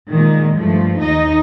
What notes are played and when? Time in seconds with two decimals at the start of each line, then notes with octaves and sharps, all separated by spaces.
0.10 A#2 D#3 G#3
0.57 G2 F3 A3
1.02 D#2 D#4 D#5